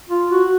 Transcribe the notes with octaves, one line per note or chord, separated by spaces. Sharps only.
F4
F#4